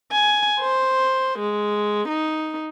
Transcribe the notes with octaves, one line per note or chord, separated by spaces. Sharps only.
G#5
C5
G#3
D#4